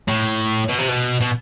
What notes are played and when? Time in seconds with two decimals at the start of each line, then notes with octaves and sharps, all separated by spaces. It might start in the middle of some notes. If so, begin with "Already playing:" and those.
0.08 A2
0.69 B2
0.79 C3
0.88 B2
1.21 B2